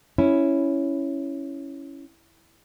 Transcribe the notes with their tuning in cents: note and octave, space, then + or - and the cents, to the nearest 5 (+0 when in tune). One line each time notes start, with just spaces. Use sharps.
C#4 +0 E4 +0